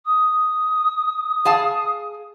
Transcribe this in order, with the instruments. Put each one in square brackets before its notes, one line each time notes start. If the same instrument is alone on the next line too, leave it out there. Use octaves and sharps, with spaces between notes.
[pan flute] D#6
[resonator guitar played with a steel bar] G#4 F5 A5